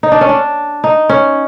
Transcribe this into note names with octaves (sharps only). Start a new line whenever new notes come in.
D#4
D4
C#4
D4
D#4
C#4